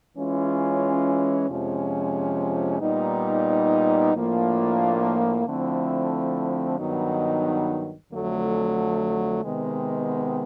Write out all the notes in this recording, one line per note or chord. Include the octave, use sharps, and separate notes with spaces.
E3 G#3 C#4 F4
F2 C3 F3 G#3 C#4
A#2 G3 B3 D#4
A2 F3 A#3 D4 F4
D3 F3 A3 C4 E4
G2 D#3 F#3 B3 D#4
F2 D3 F#3 A3
C3 D#3 G#3 B3